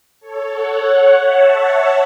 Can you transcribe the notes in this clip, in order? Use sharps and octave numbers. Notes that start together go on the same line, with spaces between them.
A4 C#5
C#5 F#5
E5 A5